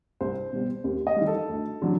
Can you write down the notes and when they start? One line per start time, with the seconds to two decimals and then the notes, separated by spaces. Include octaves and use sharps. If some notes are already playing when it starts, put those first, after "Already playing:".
0.21 C2 C5
0.53 B2 G3
0.84 D#2
1.07 D#5
1.16 D#3 G3
1.27 A4
1.49 D2
1.82 D3 F#3